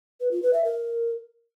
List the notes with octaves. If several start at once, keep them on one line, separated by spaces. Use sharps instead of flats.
B4
F4
B4
E5
A#4